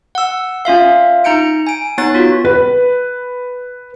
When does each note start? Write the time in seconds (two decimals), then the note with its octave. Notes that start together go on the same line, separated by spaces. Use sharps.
0.15 F#5 E6
0.65 C#4 F4 E5 F5
1.24 D#4 A#5 G6 C#7 D7
1.67 G#5 D7
1.98 B3 D#4 C#5 F#6 A6
2.15 F4 F#4
2.45 B4